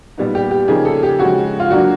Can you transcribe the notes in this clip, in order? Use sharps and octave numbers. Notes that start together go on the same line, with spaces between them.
A#2 G3 B3 D#4
G4
G4
C#3 F3 A#3 D#4 G#4
A4
G4
C#3 F3 G#3 F#4
F4
D3 F#3 A#3 D4 F#4